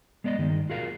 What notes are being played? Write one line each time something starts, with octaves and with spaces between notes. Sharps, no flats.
G#3 B3 D5 D#5
G2 D#3
F4 F#4 G#4 A#4 F5